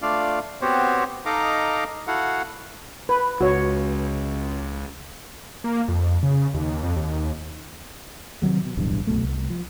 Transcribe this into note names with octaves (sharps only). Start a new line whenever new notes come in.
A3 D4 F4 D5 F5
B3 C4 F#4 G4 C5 C#5
D#4 A4 D#5 F5 A#5 D6
E4 F#4 A4 F5 F#5
B4
C#2 F#4 C#5
A#3
F2
C#3
D#2
F2
D#2
C3 D#3 F#3 G#3
B2
D1 B1 E2 G2
C2 F#2 B2 A3
C2
F3